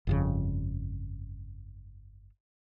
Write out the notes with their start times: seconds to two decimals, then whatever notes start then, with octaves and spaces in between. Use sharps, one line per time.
0.07 G1 F2 C#3